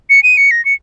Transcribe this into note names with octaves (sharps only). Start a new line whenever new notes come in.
C#7
D#7
C#7
A#6
C#7